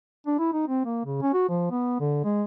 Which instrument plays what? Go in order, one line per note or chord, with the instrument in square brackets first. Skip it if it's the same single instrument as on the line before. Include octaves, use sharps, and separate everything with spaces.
[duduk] D4
E4
D#4
C4
A#3
C#3
C#4
F#4
F3
B3
D3
G#3